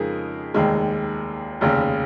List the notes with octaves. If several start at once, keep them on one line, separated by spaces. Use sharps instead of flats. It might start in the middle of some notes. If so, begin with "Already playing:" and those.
Already playing: F2 C#3 G#3 D#4 A#4
F1 D#2 D#3 G#3
F1 D#2 C#3